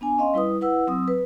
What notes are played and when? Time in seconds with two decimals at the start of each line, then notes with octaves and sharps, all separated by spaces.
0.01 B3 D4 G#5
0.18 C#4 D#5 F5 C6
0.34 G3 E4 B4 D#6
0.61 E4 B4 F#5 E6
0.87 F#3 C4 D#6 E6
1.08 B4